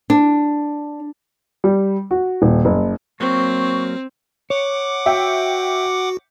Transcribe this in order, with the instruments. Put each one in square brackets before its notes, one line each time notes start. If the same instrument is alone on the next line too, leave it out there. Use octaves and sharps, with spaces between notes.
[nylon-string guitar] D4
[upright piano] G3
F#4
D#1
F#1
[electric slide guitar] F#3 A#3 [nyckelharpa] C4 [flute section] C#6
[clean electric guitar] C#5 [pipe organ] F#5 D6
[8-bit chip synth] F#4 [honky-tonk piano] E5 G5